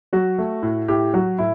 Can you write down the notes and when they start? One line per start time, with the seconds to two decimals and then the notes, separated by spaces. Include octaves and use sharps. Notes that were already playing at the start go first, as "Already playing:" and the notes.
0.13 F#3 F#4
0.38 A3
0.63 A2
0.88 A2 G4
1.14 F#3 F#4
1.38 A2 E4